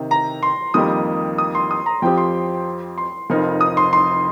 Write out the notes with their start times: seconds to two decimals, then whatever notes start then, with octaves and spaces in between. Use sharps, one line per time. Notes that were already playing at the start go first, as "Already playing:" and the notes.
Already playing: C3 D#3
0.11 A#5
0.43 C6
0.74 F2 D#3 G3 A#3 G4 D#6
1.38 D#6
1.55 C6
1.71 D#6
1.86 A#5
2.02 F2 F3 C4 G4 G5
2.18 C6
2.98 C6
3.30 F1 F2 F3 D#4 A#4
3.61 D#6
3.77 C6
3.93 C6